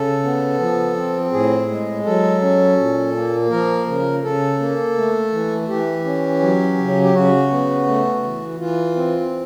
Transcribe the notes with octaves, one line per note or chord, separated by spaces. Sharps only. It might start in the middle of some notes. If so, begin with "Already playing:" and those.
Already playing: C#3 A4
B3
F3
C4
A2 G#4
G#3
F#3 A4
C#4
A#2
A#3
F3 A#4
C#3
C#3 A4
A#3
A3
E3
E3 G4
C#4
F#3
C#3
G4
C#3 F#4
B3
A3
E3
E3 F4
C4